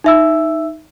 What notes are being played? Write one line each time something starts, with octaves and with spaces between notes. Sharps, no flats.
D#4 E5 E6